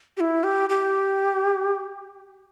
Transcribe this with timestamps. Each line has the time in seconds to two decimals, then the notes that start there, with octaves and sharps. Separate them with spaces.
0.17 G4
0.20 E4
0.44 G4
0.70 G4